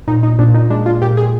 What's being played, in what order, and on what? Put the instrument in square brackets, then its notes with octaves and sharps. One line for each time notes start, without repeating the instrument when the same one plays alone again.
[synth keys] A#2 D#4
D#4
A#2 D4
D#4
G#3 D4
F4
A#2 G4
G#4